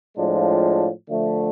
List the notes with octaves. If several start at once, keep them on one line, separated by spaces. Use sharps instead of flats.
A2 F3 G#3 D4 F4
D3 F3 A3